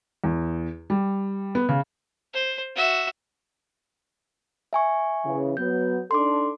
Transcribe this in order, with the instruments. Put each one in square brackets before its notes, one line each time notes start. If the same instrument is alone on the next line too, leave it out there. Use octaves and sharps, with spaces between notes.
[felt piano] E2
G3
B3
C#3
[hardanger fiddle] C5
F#4 E5
[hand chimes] E5 G#5 C#6
[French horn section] C#3 E3
[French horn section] F#3 B3 [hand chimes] G6
[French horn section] D4 D#4 A4 [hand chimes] C6 D6